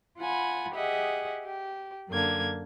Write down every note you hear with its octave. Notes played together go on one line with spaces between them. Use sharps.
F4 F#5 G#5 B5
G4 G#4 D#5 E5 F#5
G4
F#2 D3 A#3 G#6